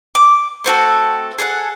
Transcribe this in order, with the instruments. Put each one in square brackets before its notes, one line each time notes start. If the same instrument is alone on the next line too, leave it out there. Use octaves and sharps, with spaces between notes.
[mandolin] D6
A3 C4 F#4 A4
G#4 A4 E5 F#5